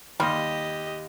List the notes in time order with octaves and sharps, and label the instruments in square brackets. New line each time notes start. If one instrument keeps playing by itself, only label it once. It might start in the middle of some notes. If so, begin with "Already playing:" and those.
[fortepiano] D#2 C6 F6 [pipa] G3 [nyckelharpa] G4 D#5